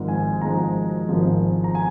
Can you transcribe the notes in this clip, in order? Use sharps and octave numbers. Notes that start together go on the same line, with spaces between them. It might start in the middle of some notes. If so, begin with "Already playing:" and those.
Already playing: G#1 G#2 F3 G#3
G#5
G#1 G#2 F3 G#3 A#5
G#1 G#2 F3 G#3
A#5
G#5